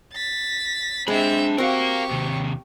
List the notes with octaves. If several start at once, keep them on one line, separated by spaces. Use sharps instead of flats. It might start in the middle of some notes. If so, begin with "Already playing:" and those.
A6 B6
G#3 C4 D4 E5 B5
C4 F#4 G4 A#4 F5 C#6
D#2 C3